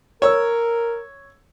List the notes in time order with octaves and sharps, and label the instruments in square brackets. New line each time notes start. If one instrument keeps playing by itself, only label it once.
[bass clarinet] A#4 [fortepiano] C#5 E6